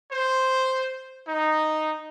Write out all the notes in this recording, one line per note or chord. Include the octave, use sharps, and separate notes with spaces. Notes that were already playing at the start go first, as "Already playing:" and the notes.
C5
D#4